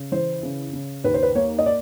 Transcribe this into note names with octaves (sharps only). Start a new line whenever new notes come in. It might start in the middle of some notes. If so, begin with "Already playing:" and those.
Already playing: C#3
E3 C5
C#3
C#3
D#2 B4
C5
B4
A#3 C#5
D#5
D5